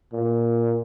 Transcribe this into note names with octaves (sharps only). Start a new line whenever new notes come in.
A#2